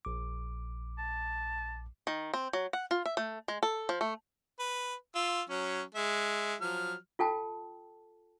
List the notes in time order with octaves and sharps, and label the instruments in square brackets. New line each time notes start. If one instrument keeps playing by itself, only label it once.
[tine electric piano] A#1 D6
[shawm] A5
[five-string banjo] D#3
C4
F#3
F#5
F4
E5
A3
G#3
A4
F3
A3
[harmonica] B4
F4 E6
F#3 C#4
G#3 E5
F3 F#3 F6
[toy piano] F4 A4 G5 A5